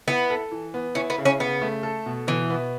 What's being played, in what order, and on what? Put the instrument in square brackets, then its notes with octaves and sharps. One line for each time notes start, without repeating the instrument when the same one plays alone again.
[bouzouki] B3 [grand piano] E4
[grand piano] A4
E3
B3
[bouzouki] C#4 [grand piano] E4
[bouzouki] B3
[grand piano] C#3
[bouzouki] C#4
[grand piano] C#3 [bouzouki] B3
[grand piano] A3
A4
B2
[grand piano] B2 [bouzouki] E3
[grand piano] B3